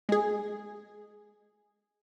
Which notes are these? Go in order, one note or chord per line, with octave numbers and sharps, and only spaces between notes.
G#3 G#4